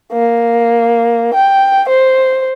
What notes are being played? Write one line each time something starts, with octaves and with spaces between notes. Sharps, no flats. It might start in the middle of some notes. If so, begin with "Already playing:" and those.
A#3
G5
C5